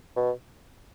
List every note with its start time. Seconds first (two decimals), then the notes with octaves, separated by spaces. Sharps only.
0.16 B2